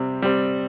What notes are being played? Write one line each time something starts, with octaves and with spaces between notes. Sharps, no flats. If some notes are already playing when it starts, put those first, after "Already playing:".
Already playing: C3 G3 C4
G3 C4